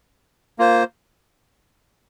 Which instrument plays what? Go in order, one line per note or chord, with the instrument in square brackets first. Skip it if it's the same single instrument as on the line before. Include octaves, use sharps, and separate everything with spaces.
[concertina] A#3 F4 C5